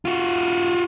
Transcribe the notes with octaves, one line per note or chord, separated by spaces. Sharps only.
F4 F#4